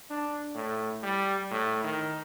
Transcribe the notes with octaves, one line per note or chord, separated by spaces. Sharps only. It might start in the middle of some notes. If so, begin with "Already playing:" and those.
D4
A2
G3
A2
D#3